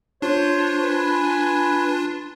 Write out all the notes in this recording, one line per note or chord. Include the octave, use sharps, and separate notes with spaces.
D4 F4 C5 C#5
B4 G#5